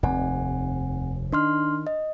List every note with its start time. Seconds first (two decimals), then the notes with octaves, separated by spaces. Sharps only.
0.03 F1 D#2 C4 F#5 G#5
1.32 D#3 D4 C6 F6
1.87 D#5